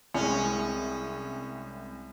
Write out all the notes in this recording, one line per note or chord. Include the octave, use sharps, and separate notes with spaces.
C2 G#3 C#4